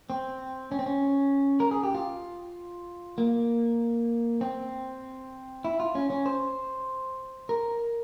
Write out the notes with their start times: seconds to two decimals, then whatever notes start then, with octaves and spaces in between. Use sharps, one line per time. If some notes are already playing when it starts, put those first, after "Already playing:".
0.10 C4
0.72 C#4
0.79 C4
0.86 C#4
1.60 A#4
1.71 G#4
1.84 G4
1.94 F4
3.18 A#3
4.41 C4
5.64 E4
5.80 F4
5.95 C#4
6.10 C#4
6.26 C5
7.49 A#4